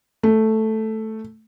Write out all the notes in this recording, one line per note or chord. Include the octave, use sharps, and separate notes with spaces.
A3